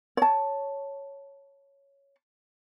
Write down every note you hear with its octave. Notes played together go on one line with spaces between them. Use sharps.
C#5 A5